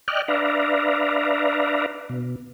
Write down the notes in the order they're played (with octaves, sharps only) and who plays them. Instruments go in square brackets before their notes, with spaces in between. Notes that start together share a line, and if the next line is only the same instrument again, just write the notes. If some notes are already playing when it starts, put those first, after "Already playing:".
[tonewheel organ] D5 D#5 G5 F6 F#6
D4 B4 D5 E5 F5 A#5
B2